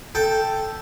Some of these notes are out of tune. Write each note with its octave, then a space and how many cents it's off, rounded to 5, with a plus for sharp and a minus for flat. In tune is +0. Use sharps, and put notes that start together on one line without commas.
A4 +0 G5 +0